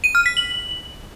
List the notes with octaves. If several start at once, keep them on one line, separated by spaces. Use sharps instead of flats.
D#7
F6
B6
F#7